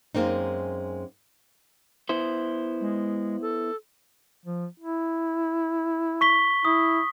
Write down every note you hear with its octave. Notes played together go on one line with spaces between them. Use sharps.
F#2 G#3 A#3 C4 D#4
B3 E4 C5
G#3
A4
F3
E4
C#6 B6 G7
E4 D#6